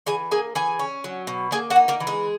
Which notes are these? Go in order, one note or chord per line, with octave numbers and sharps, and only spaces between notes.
E3 G#4 G#5
A#3 G#4 G#5
E3 G#4 G#5
C#4
F#3
B2
A#3 G#4 G#5
F#4 F#5
D#4
A#3 A#4
E3
G#3 G#4